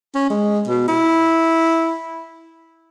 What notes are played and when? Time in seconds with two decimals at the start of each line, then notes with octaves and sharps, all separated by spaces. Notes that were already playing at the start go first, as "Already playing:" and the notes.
0.15 C#4
0.30 G#3
0.68 B2
0.88 E4